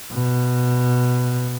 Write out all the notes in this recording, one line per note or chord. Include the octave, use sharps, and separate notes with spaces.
B2